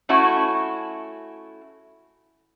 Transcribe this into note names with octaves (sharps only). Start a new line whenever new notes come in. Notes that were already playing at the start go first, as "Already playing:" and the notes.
A3 C#4 E4 F#4